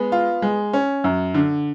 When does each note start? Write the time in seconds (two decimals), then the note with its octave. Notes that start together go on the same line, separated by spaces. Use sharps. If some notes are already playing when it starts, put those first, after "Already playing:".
Already playing: G#3 B3
0.12 F4
0.42 G#3
0.73 C#4
1.04 F#2
1.34 D3